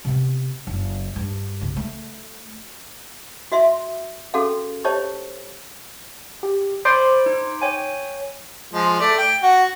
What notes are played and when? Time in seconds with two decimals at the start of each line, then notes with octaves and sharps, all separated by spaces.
0.05 C3 B3
0.67 F#1
1.16 G2
1.61 C2 C#3
1.76 A3
3.52 F#4 D#5 E5 C6
4.34 C#4 F#4 G#4 A4 F5
4.84 G4 C5 C#5 D#5 A5
6.43 G4
6.85 C5 D5 B5 D6
7.26 D#4
7.61 C#5 G5 G#5
8.73 F3 G#3
9.00 A3 D5
9.18 G5
9.43 F#4